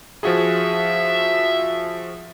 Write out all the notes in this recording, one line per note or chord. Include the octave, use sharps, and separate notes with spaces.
F3 F#4 G#4 E5